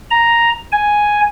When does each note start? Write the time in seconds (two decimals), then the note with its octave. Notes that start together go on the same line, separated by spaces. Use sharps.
0.11 A#5
0.72 G#5